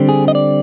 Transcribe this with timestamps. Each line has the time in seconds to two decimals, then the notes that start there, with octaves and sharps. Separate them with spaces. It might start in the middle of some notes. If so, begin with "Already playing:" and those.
Already playing: D3 G3 C4
0.09 G#4
0.28 D#5
0.35 D5